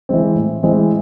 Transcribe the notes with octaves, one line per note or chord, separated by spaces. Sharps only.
E3 G#3 C4
A2
E3 G#3 C4